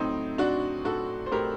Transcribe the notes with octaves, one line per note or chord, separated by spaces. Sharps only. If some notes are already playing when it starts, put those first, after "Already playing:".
Already playing: A2 F#3 C4 D#4
A2 D4 F#4
A2 F#4 A4
C5
A2 G4 A#4